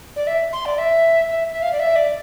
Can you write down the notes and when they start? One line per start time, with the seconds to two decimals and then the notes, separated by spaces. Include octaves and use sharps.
0.16 D5
0.27 E5
0.53 C6
0.66 D5
0.78 E5
1.28 E5
1.51 E5
1.62 F5
1.72 D5
1.79 E5
1.96 D5